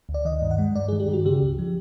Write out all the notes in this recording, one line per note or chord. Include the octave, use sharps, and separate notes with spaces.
D2
D5
D#3 D#5
G2
F#5
G#3
G2 D5
D#3 G#4
G4
G2
F#4
C#3 G4
C#2
F3